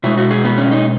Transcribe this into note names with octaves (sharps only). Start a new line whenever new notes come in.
B2 G#3 E4
F#4
G#4
B3
C#4
D#4